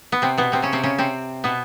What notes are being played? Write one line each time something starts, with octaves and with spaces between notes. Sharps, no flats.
B3
C3 C4
B2 B3
C3 C4
C#3 C#4
C3 C4
C#3 C#4
C3 C4
B2 B3